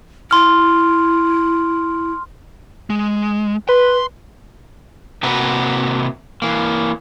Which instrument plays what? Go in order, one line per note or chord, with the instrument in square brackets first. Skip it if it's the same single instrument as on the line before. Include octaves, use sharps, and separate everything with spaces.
[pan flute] E4 [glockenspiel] C6 F6
[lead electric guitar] G#3
[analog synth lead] B4 [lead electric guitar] C6
[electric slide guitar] C3 A#3 C4 F#4 B4
E3 A#3